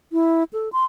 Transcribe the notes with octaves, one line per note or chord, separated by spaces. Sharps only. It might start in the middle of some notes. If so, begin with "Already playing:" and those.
E4
A4
C6